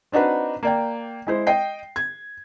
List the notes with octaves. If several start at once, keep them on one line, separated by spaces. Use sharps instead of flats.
C4 D4 D#4 F#4 B4
A#3 D5 G5
G#3 E4 C5
D#5 G5 C7
G#6